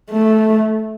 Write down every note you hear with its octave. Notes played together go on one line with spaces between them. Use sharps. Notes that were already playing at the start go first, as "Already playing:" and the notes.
A3